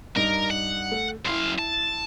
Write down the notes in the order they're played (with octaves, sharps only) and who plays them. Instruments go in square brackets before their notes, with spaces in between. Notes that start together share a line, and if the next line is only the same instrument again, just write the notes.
[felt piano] G2 D#4 [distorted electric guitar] A#4
[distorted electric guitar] F#5
[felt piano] A3
[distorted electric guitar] F#2 F5 [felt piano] E4 C6
[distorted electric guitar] A5